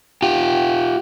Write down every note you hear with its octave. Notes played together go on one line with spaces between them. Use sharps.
F4 G4